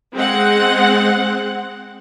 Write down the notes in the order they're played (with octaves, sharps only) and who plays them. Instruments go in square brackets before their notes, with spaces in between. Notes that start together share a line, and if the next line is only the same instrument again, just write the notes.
[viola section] G#3 C4 F#5